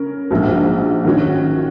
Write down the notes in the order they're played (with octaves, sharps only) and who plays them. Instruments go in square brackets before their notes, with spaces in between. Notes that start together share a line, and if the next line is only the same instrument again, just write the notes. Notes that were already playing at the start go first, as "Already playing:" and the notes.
Already playing: [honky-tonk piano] C#3 C#4 A#4
A#1 G#2 F#3
D#3 F#3 C#4 F#4